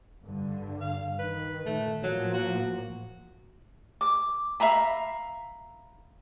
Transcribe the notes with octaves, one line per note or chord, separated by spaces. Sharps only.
G2 D3
F5
D#3 B4
A#2 D#3 A3
A2 F3 F#3 A#3
F#4
D6
E5 F5 A#5 B5